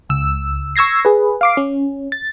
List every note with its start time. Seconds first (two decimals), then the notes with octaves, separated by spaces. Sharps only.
0.09 C#2 E6
0.76 C#6 E6 G#6 A#6 C7
1.05 G#4 B4
1.41 F5 D6 C7
1.57 C#4
2.12 A6